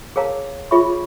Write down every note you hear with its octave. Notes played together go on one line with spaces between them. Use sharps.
G#4 A#4 C#5 F5 A5 A#5
F4 G#4 C#5 E5 B5 C#6